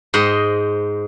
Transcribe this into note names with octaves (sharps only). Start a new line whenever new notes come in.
G#2 C5 D#5